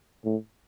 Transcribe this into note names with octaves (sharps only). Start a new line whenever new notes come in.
A2